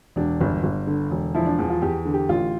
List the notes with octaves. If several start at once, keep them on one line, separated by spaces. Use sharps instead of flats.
E1 D4
G1
G1
D3
E1
F3 E4
D4
E2
F4
E2 G4
D3
G4
A1 F4